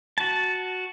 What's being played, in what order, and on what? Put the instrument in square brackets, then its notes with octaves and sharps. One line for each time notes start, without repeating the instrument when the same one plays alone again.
[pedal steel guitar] F#4 A5